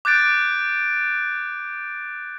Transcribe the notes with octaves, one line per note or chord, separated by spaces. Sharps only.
D6 F#6 G6 A6 D7